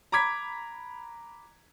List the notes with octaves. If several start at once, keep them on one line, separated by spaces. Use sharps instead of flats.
A#5 B5 D6 G#6 B6